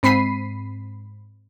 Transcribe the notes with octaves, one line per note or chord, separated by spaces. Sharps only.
G#2 C4 B5 B6 C7 D#7